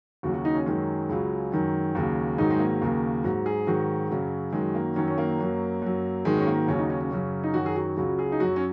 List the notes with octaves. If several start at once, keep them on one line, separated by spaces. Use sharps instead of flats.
D#2 C#3 F#3 F#4
F#4
D#4
C#4
F#2 D#3 F#3 G#3
C#2 C#3 F#3
F#2 D#3 F#3
D#2 C#3 F#3
G#2 D#3 F#3 D#4
G#3
A#3
D#2 C#3 F#3
G#2 F#3 F#4
G#4
G#2 D#3 F#3 F#4
F#2 C#3 F#3
F#2 D#3 F#3 G#3
A#3
F#2 D#3 F#3 C#4
C#4
A#3
F#2 F#3
F#2 F#3
G#2 D#3 F#3 G#3
C#4
A#3
D#2 C#3 F#3 C#4
D#4
C#4
C#4
F#2 C#3 F#3
D#4
F#2 D#3 F#3 F#4
G#4
F#4
C#2 C#3 F#3 F#4
G#4
D#4
F#2 F#3 F#4
C#4